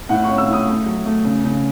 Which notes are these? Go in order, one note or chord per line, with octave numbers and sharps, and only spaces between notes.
A2 F#5
C#4 C#6
E6
A2
D#6
A3
F#3
A3
C#3
C#3